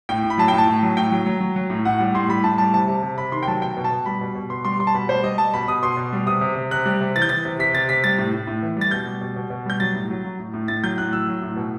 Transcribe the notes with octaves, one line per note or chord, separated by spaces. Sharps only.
A2 G5
A2
B5
F#3 A5
A2 G5
A5
A2
F#3
A2 G5
F#3
F#3
F#3
F#3
A2
A2 F#5
G3
A2 C6
G3 B5
A2 A5
G3 A5
C3 A5
C3
C3
C3 B5
D#3 C6
G5
F#3 A5
B2 G5
B2
A5
B2
G3 B5
B2
B2
B2 C6
G3 C6
G3 C6
A5
B2 B5
G3 C5
G3 D#5
G3 A5
B2 B5
B2 D#6
B2 C6
B2
G3
C3 D#6
C3
C3
C3 F#6
G3
C3
E3 A6
G6
E3 A6
C3
C3 B6
C3 A6
C3 B6
G3 A6
A2
A2
A2
E3
G3 A6
B2 G6
G3
B2
B2
B2
G3 G6
F#3 A6
A2
F#3
F#3
A2
A2
A2 A6
F#3 G6
A2 F#6
F#3 E6
F#3
A2
B2